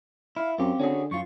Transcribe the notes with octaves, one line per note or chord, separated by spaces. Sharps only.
E4 F5
F#2 C4 F4 G4
D3 C#4 F#4 G#4
F#2 F4 C#6